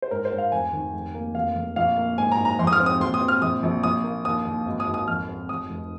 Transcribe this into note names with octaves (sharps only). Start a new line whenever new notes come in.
C5
G#2 A#4
C5
G#2
F5
F1 G#5
D#3
F1
A#3
F1 F5
F1
A#1 F5
A#3
G#2 G#5
A#5
G#2
A#5
F2 C6
D#6
F6
C4
D#6
A#1 C6
D#6
C4
F6
A#1 D#6
A#1
A#1 D#6
A#3
D#2 D#6
D#2
G#1
D#6
G#1
D#6
F2 F6
C4
F1 D#6
F1